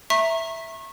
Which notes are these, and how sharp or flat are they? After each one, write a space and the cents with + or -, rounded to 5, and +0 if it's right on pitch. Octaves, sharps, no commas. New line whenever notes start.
E5 +0 A#5 +0 C#6 -30